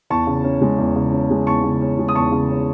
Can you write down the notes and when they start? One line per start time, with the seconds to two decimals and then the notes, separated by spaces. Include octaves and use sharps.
0.10 E2 A5 C#6
0.27 C#3
0.44 C#4
0.61 G#3
0.78 E2
0.96 C#3
1.12 C#4
1.30 G#3
1.47 E2 A5 C#6
1.63 C#3
1.82 C#4
1.99 G#3
2.08 D#6
2.15 E2 A5 C#6
2.32 C#3
2.50 C#4